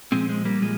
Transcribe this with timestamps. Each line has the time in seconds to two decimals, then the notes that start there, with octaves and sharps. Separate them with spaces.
0.12 A#2 F3 G#3 C4
0.29 G#3
0.45 G3 A#3
0.62 A#2 F3 G#3